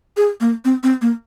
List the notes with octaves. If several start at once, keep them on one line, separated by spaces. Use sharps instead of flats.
G#4
A#3
C4
C4
A#3